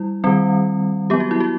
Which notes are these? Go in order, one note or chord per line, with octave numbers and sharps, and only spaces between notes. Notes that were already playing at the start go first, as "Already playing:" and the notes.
Already playing: G3 E4
D#3 G3 C4
F#3 B3 G4
F#4
E4
F#4